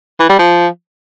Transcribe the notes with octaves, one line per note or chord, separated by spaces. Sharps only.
E3
G3
F3